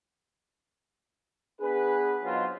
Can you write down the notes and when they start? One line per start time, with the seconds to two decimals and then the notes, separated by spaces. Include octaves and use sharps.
1.61 B3 D4 G#4 B4
2.23 G#2 B2 F#3 C4 F4